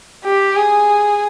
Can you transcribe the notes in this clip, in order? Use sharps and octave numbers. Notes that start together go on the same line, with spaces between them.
G4
G#4